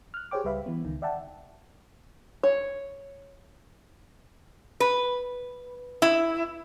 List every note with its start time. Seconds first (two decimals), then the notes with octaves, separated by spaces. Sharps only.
0.14 F6 F#6
0.31 G4 G#4 C5 C#5 G5 D6
0.44 C#2 G3 B4 E5 F5 B5
0.66 E3 B3
0.85 C#2 D#3
1.02 D5 E5 F#5 G5 A5
2.43 C#5
4.80 B4
6.02 E4